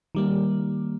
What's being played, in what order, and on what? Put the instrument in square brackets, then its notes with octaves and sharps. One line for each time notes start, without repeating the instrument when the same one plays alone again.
[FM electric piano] D#3 G3 A#3